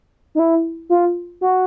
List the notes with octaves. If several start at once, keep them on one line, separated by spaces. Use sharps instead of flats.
D#4
E4
F4
F#4